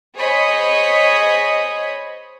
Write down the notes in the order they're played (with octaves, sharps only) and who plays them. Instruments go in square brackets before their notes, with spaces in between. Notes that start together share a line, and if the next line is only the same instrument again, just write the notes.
[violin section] G#4 C5 C#5 D#5 B5 D#6